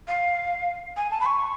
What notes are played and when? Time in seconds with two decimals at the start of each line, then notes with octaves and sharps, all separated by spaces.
0.08 F5
0.97 G#5
1.11 A5
1.21 B5
1.26 C#6